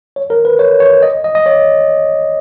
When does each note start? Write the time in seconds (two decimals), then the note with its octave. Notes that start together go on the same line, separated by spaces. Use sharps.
0.16 C#5
0.30 A#4
0.45 B4
0.59 C#5
0.80 C#5
1.03 D#5
1.24 D#5
1.35 D#5
1.46 C#5